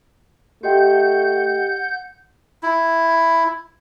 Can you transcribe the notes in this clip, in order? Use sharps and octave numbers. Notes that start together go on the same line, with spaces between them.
A3 G4 D#5 F#5 G5 G6
E4